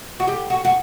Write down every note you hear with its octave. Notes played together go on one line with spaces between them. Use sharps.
F#4
G4
F#4
F#4